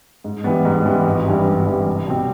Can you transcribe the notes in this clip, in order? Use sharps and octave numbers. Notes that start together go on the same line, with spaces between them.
G#2
E3 G3 B3
G#2
E3 G3 B3
G#1
G2 E3 G3
G#1
G2 E3 G3
C2
B2 G3 C4